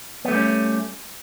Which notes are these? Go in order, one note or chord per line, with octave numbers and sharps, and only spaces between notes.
G3 A3 B3 C#4